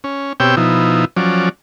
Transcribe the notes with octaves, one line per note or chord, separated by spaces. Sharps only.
C#4
B2 C4 G4 C#5 G5 E6
B2 F3 D#4 E4
F3 F#3 C#4 D5